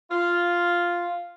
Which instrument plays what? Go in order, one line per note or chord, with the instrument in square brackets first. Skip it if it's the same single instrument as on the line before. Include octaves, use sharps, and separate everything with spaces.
[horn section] F4